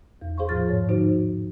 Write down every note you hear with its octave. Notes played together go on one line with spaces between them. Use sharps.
E2
G#4 C5 F5 C6 C#6
E2 A2 F3 F4 F6 A6
G#2 C#5
D3 F3 D#4 F#4 C5